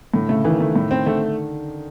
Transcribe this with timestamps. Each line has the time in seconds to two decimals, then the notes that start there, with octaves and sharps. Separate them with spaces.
0.13 A2 D3
0.29 C#3 A3
0.44 D#3 E3
0.60 A3
0.76 A2
0.91 C4
1.06 D3 A3